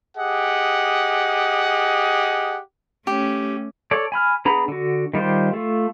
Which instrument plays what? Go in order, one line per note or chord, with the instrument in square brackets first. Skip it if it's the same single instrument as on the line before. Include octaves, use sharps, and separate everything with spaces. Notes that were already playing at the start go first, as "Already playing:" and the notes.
[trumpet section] G4 G#4 D#5 F#5
[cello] A3 C#4 [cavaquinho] G4
[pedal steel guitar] A4 C#5 D5
G#5 B5 F6
B3 D4 G#4 A#5 B5
D3 F#4
D#3 G3 F4 G4 C5
A3 F4